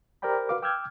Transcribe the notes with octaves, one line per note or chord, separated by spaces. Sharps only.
G4 A#4 C5 D5 G5 B5
F#4 B4 F5 D6
G5 D6 E6 F6 G6 G#6